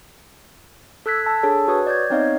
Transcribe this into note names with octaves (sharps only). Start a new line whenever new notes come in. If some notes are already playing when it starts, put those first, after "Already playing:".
A4 E6 F#6 G#6 B6
A5
D4 G#4 A4 C#5 A5
F#4 B4 C#5 D#6
D5 G6 G#6
B3 C4 D#4 C#5 D#5 F5